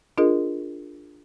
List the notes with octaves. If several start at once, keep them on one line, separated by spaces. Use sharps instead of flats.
D4 F4 G#4 A#4 D#5